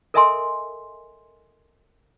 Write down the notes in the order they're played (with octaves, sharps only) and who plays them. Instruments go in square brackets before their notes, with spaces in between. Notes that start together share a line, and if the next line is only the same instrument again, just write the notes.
[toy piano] A4 A#4 D#5 E5 G#5 C6